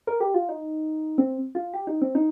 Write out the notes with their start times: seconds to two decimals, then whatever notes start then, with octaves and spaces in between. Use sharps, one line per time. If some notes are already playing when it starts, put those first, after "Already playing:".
0.07 A#4
0.20 G4
0.34 F4
0.49 D#4
1.18 C4
1.55 F4
1.74 G4
1.87 D#4
2.02 C4
2.15 D#4